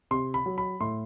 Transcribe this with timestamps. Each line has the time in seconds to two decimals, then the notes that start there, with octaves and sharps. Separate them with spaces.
0.11 C3 C6
0.34 B5
0.46 F#3
0.58 B5
0.80 A2 C6